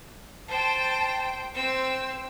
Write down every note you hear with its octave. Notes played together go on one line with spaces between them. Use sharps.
C5 G5 A5
C4 C5 E6